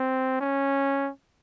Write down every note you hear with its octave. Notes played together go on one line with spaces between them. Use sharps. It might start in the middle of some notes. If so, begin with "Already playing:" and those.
Already playing: C4
C#4